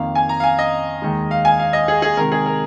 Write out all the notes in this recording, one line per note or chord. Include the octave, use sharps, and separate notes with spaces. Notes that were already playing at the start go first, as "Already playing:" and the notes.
Already playing: F2 D#3 A#3 F5
G#5
A#5
F5
G#5
D#5
D#2 D#3 G#3
F5
G#5
F5
D#5
G#4
G#4
C3 D#3 G#3 A#4
G#4
A#4